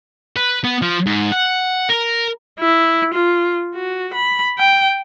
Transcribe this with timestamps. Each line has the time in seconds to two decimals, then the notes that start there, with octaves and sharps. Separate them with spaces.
0.36 B4
0.64 B3
0.82 F3
1.06 G#2
1.32 F#5
1.89 A#4
2.60 E4
3.14 F4
3.75 F#4
4.14 B5
4.59 G5